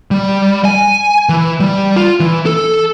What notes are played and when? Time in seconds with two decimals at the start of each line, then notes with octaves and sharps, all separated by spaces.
0.11 G3
0.65 G#5
1.29 E3
1.60 G3
1.96 F4
2.20 E3
2.46 A4